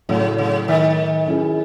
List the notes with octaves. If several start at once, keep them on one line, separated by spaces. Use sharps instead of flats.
A2 C#3 F#3 A3
C#3
D#3
F#3 C#4 E4 G#4